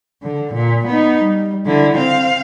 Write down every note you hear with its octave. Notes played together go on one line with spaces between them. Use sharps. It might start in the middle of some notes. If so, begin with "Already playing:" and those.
D3
A#2
B3 D#4
G3
D3 E4
C4 F5